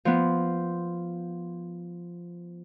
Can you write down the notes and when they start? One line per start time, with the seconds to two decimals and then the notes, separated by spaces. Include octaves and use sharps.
0.05 F3 B3